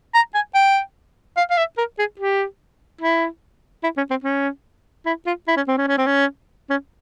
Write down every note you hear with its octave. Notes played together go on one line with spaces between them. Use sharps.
A#5
G#5
G5
F5
F5
E5
A#4
G#4
G4
E4
E4
C#4
C4
C#4
E4
F4
E4
C#4
C4
C#4
C#4
C4
C#4
C#4